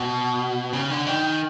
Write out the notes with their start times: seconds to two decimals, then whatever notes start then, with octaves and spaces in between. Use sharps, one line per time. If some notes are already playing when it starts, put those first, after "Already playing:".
Already playing: B2
0.73 C#3
0.90 D3
1.07 D#3